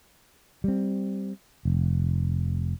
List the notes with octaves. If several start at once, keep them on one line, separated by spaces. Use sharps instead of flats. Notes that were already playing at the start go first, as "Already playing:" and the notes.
G3 C4
F1